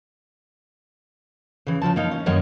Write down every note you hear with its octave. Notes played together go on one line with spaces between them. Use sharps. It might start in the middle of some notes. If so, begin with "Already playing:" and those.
C#3 E3
C#3 E3 F3 A5
A#3 D#4 F5
C#4
F#2 D#3 G3 A#3 C#5 D#5